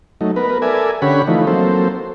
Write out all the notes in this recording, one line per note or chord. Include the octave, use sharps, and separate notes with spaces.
F#3 A3 D#4
B3 A#4 B4
A4 A#4 D5 E5 G#5
D3 C#4 G4 C#5 F#5 B5
E3 F3 A3 D#4
F#3 A#3 C4 A4 C5